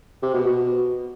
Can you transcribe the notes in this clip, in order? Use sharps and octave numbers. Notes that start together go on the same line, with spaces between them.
C3
B2
B2